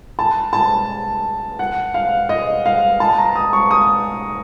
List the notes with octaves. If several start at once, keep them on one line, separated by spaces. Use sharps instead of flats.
A5
A5
F#5
F5
D#5
F5
A5
A#5
D#6
C#6
D#6